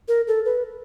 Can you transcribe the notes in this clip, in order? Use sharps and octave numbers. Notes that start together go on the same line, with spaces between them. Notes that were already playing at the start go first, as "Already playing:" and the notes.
A#4
A4
B4